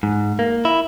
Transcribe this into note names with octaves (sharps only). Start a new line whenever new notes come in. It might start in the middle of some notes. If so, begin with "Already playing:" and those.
G#2
A#3
E4